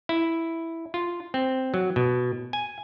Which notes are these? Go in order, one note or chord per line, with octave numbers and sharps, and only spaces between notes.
E4
F4
C4
F#3
B2
G#5